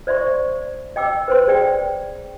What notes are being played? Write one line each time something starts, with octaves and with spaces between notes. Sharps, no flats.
C5 D5 E5 C6 C#6
D#5 G5 D6 E6
B4 C5 C6
G#4 D5 G5